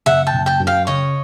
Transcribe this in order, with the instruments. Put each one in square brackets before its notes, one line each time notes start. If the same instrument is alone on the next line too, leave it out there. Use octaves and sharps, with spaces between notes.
[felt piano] F#1 [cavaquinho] E5 F#5
[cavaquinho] G5 A5
[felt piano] F#1
[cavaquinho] G5 A5
[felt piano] F#2
[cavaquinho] F5 G5
[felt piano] C#3 [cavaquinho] C#5 D#5